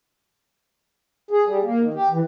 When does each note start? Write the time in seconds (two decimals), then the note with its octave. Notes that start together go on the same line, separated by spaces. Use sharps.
1.31 G#4
1.47 G3
1.63 A#3
1.81 D#3
1.94 G4
2.11 E3